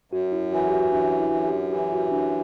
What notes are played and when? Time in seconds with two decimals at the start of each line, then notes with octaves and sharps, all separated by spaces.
0.12 F#2 F#4
0.32 E4
0.52 E3 F#4
0.68 G4
0.73 F#4
0.92 F#2 D4
1.20 E4
1.32 F#2
1.46 G4
1.72 E3 G4
1.93 F#4
2.12 F#2 D4